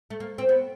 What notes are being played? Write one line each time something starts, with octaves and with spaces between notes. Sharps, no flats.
A3
A#3
C4
B3